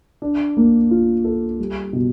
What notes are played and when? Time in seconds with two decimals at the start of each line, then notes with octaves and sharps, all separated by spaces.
0.22 D4
0.57 A#3
0.91 F4
1.24 A4
1.59 G3
1.93 B2